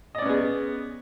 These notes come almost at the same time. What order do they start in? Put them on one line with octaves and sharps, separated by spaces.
D#5 D5 C#4 B3 G#4